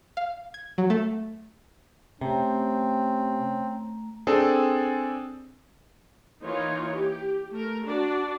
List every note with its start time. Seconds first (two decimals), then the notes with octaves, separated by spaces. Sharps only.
0.17 F5
0.54 G#6
0.78 F#3
0.90 A3
2.21 C3 A3 C4 C#4 A#5
4.27 C4 D4 G#4 A4 G#5
6.44 E3 A#3 D#4 F4 C#5
6.95 G4
7.51 A3 A#4
7.86 D4 F#4 D5